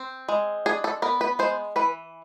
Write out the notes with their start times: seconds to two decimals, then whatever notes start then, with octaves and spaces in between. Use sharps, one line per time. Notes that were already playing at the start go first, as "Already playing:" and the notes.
Already playing: C4
0.28 G#3
0.66 D4 G#4
0.84 A4
1.02 B3 A#4
1.21 B4
1.39 G#3 C5
1.76 E3 B4